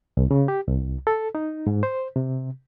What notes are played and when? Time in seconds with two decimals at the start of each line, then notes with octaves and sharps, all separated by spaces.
0.17 C2
0.31 C#3
0.48 G4
0.67 C2
1.07 A4
1.35 D#4
1.67 G#2
1.83 C5
2.16 C3